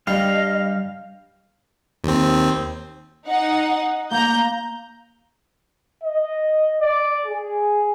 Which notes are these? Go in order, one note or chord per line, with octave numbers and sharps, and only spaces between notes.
G2 G3 D#5 F5
D#2 C4
D#4 F#5
A#3 A#5 G6
D#5
D5
G#4